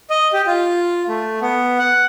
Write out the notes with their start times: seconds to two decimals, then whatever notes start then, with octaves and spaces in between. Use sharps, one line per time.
0.10 D#5
0.33 G4
0.47 F4
1.09 A3
1.42 B3
1.78 F#5